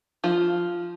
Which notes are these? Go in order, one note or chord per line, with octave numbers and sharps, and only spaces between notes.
F3 F4